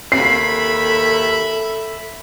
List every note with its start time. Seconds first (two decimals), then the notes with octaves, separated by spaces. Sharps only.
0.12 D#2 A4 E5 B5 C7